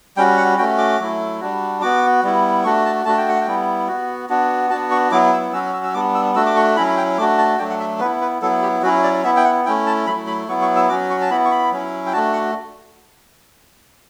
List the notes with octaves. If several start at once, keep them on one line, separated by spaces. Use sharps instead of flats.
G3 C#4 F#4 G5
F#5
A3 C#4 F#4 G5
D6
F#3 A3 E4
G3 D4 F#4
B3 F#4 D6
G3 B3 E4
A3 D4 F#4 C#6
A5
A3 D4 F#4 A5
G5
F#5
G5
G3 B3 E4
B3 F#4
B3 D4 F#4
B3 D4 F#4 A5
C#6
F#3 B3 E4 D6
E6
F#3 C#4 F#4 E6
E6
E6
G3 B3 D4 D6
E6
A3 D4 F#4 E6
D6
C#6
F#3 C#4 E4 B5
G5
A3 D4 F#4 D6
A5
F#3 A3 D4 G5
F#5
E5
B3 E4 B4
B4
F#3 B3 E4 A4
G4
F#3 C#4 E4 F#4
D5
B3 E4 E5
G5
F#5
A3 C#4 E4 G5
A5
F#3 A3 E4 B5
B5
F#3 B3 E4 C#6
C#6
E6
F#3 C#4 F#4 D6
C#6
A5
B3 E4 B5
C#6
B5
F#3 C#4 E4
G5
A3 D4 F#4 A5
F#5